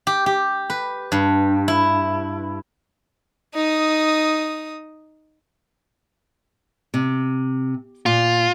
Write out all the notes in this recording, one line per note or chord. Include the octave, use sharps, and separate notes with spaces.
G4
G4
B4
G2
E4
D#4 D#6
C3
A#2 F4